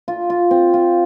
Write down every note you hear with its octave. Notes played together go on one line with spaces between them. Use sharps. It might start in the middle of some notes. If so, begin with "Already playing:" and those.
F4
F4
C4
F4